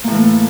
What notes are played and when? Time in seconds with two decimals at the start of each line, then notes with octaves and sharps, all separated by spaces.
0.04 A#3
0.07 A2
0.11 E3
0.14 A3